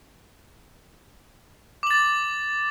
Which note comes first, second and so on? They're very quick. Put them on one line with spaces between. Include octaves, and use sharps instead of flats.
D6 F#7 A6